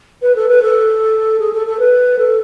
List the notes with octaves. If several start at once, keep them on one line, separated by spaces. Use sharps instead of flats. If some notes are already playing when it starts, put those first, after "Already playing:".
B4
A4
B4
A4
G#4
A4
A4
B4
A4